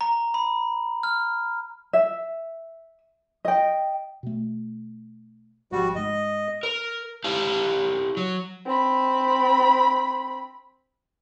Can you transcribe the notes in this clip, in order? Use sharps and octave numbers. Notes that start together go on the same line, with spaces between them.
A#5
B5
F6
E5
D#5 G5
B2 A3
G#1 F3 G3 F#4
G#2 G#3 D#5
A#4
E4 G4 F5 A5
F#3
C4 B5